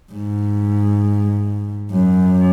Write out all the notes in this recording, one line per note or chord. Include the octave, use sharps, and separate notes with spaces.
G#2
F#2